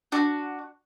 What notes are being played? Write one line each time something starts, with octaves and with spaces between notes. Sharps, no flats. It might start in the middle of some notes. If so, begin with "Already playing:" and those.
D4 F#4